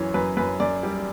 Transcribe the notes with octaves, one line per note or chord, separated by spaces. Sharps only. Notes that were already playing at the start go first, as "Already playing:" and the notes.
Already playing: F#2 E3 C#5
F#2 B4
F#2 B4
F#2 D5
G3